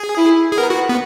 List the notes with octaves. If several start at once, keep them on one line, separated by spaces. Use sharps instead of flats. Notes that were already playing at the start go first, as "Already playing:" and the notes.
Already playing: G#4
E4
G#4
B3 A#4
F#4
B3